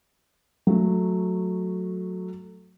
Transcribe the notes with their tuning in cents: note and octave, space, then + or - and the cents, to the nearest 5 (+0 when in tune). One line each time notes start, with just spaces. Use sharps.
F#3 -10 A3 +0